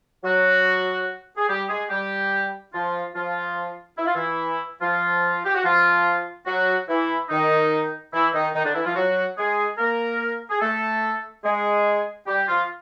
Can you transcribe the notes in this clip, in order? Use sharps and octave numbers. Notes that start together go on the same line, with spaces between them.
F#3 F#4
G#4
G3 G4
G#3 G#4
G3 G4
F3 F4
F3 F4
E4
F4
E3 E4
F3 F4
G4
F#4
F3 F4
F#3 F#4
E3 E4
D#3 D#4
E3 E4
D#3 D#4
D#3 D#4
D3 D4
E3 E4
F3 F4
F#3 F#4
G#3 G#4
A#3 A#4
G#4
A3 A4
G#3 G#4
G3 G4
F3 F4